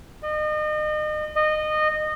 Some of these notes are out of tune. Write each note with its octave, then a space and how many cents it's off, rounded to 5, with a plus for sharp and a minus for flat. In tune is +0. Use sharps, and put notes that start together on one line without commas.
D#5 -35
D#5 -20